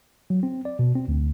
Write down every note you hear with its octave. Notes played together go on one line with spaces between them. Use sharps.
F#3
C4
D5
B2
C4
D2